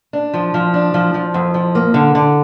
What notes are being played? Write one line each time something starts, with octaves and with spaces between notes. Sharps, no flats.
D4
F3
F3
D4
F3
F3
F2
F3
A#3
D3
D3